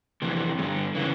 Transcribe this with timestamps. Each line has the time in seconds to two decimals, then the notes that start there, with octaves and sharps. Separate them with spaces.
0.22 F2 C3 E3
0.58 G2 F#3
0.63 D3
0.95 C#3 E3